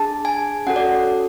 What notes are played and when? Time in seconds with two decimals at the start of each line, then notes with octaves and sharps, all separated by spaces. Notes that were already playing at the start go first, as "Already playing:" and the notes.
Already playing: D4 G#4 A5
0.25 G#5
0.67 C#4 F#4 A4 F#5
0.76 D5